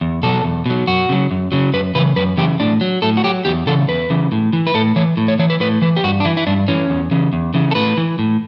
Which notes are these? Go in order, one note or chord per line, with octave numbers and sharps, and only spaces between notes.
E2
B2 F#3 A4
E2
B2 F#3
F#2 F#4
C#3 F#3
F#2
C#3 F#3
F#2 B4
C#3 E3 B4
F#2 B4
C#3 E3 G4
A2 D4
F#3
A2 A4
F#4
F#3 G4
E2 G4
C#3 E3 A4
E2 B4
C#3 E3
A2
E3
B4
A2 A4
E3 C#5
A2
C#5
E3 C#5
B4
A2 B4
E3 B4
G4
G2 F#4
D4
E3 E4
E4
G2 D4
E3 C#4
E2
C#3 E3
E2
C#3 E3
A4
A2 B4
E3
A2